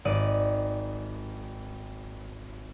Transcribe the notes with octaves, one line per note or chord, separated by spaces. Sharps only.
G#1 D5 D#6